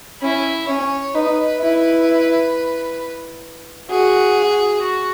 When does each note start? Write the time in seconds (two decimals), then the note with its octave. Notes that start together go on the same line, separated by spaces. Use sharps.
0.22 C#4 E4
0.68 C#4 C#5
1.15 D#4 B4
1.61 E4
3.90 F#4 G#4
4.83 F#4